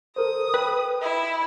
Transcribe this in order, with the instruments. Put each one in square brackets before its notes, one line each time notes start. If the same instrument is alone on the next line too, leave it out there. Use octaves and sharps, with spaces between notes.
[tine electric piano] A4 A#4 C5 [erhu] D#6
[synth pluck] B4 [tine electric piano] G5
[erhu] E4